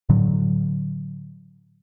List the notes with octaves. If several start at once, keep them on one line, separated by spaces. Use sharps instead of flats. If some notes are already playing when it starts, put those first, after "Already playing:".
A2 D3 F#3